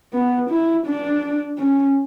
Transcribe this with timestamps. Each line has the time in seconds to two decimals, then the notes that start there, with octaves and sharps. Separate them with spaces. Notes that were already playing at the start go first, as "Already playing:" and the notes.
0.14 B3
0.50 E4
0.87 D4
1.58 C#4